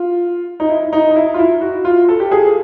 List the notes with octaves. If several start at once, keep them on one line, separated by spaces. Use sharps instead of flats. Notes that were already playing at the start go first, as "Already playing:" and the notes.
Already playing: F4
D#4
E4
D#4
D#4
E4
F4
E4
F#4
F4
A4
G4
G#4